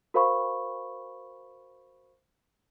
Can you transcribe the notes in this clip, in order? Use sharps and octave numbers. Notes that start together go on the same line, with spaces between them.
F#4 A#4 C5 F5 B5 C#6